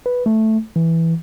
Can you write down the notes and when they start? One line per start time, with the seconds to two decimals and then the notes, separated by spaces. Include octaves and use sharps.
0.06 B4
0.26 A3
0.76 E3